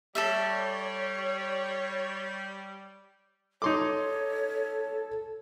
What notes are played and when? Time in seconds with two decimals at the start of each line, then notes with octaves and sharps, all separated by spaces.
0.15 G3 A4 C#5 D5 E5
3.62 D#4 A4 C#5 C6 D6